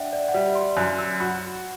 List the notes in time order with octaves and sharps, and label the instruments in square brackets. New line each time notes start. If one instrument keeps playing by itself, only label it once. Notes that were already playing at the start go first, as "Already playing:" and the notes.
Already playing: [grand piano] D4 [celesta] E5 F#5 G5
[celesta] D5
F#5
[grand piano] G3 [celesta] E5
[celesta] C6
[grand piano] F#2 [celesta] F#6
[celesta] E6
[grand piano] F#4 [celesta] B5